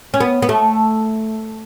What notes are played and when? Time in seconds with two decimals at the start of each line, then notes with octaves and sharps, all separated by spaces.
0.14 C#4
0.20 B3
0.42 B3
0.49 A3